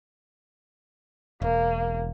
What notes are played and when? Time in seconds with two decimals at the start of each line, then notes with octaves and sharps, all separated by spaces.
1.42 E1 A#3